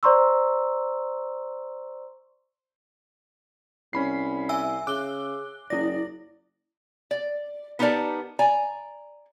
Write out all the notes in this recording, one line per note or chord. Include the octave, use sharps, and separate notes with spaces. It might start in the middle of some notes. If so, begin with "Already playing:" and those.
C5 D5 A#5 C6 C#6 E6
C2 C#4 B5 C7
E5 G#5 E6
C#3 D6 F#6 G7
F#1 E4 D5 A#6
D5
B3 D#4 G4 A#4 D5 A5
D5 G#5 A#5